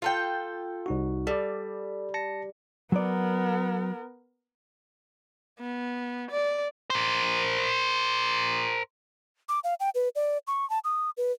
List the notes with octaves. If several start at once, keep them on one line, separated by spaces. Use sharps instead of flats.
F4 A4 G5
C2 D#4 F#4
G3 A4 D5
A5 A#6 C#7
F#3 B3 A#4 D5
B3
D5
A#4 C5
D6
F5
G5
B4
D5
C#6
A5
D#6
B4